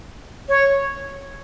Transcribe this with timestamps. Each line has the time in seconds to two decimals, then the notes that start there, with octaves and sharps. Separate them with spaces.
0.49 C#5